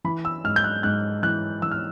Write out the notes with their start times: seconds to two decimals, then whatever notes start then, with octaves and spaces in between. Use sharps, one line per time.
0.04 E3 B5
0.25 E6
0.44 G#2 F6
0.56 G6
0.64 F#6
0.83 G#2 F#6
1.23 E3 F#6
1.62 E3 E6
1.71 F6